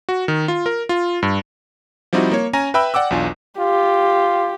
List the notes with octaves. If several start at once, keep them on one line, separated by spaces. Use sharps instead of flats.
F#4
D#3
F4
A#4
F4
G2
F3 G3 C4 D#4 E4 F#4
A#3 C#5
C#4 G#5 A#5 A#6
B4 E5 G5 B5 E6
D5 F#5 G5 D6 E6
B1 E2 D4 F4 G#5
F4 G4